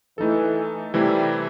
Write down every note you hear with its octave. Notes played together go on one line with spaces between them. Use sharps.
E3 A3 D#4 A4
C3 E3 G3 A3 C4 E4